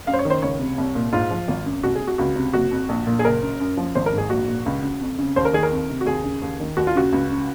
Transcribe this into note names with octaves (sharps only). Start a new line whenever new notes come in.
F#2 F5
C5
C#5
D#3
C5
C#2 C#5
C3
C2
A#2
G#2 F4
F3
G#1
F#2
C2 F#4
G#4
C3
F#4
C#2 F#4
C3
F#1 F#4
F2
A#1
A#2
G#4
F#1 A#4
F#2
F#2
F3
G#1 C5
A#4
G#2 G#4
A#1 F#4
A#2
C#2
C#3
F2
C#3
D#2 C5
A#4
D#3 G#4
A#4
F2
C3
F#4
D#2 G#4
C#3
D#2
D#3
D#2 F#4
F4
C#3 F#4
C#2
C#3